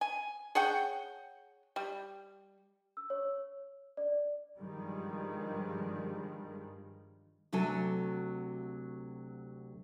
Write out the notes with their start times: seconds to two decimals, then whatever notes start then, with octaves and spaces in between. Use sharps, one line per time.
0.01 G#5
0.55 G#4 C#5 F#5 G5
1.76 G3
2.97 E6
3.10 C#5
3.97 D5
4.59 G2 D#3 F3 G3 G#3
7.52 D2 C3 F#3 A4 G#5